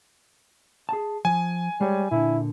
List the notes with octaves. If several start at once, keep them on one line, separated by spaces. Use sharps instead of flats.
G#4 A5
F3 G#5
G3 G#3 C#5
A#2 D3 E4